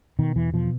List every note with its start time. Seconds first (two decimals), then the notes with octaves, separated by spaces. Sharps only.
0.19 B2 D#3
0.36 E2 E3
0.54 B2 F3